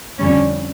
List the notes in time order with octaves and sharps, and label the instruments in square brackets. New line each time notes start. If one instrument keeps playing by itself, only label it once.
[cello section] F2 D3 G3 C#4